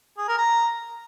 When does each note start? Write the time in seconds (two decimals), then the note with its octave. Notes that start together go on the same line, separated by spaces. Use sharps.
0.18 G#4
0.28 A#4
0.38 A#5